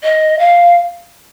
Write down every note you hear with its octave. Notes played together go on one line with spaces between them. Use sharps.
D#5
F5